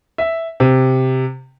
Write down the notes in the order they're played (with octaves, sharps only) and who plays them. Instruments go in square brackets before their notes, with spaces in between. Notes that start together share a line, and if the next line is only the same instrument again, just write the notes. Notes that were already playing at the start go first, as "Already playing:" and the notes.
[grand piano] E5
C3